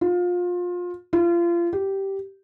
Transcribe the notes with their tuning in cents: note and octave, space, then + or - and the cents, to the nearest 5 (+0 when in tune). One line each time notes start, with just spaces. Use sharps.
F4 +25
F4 -30
G4 -10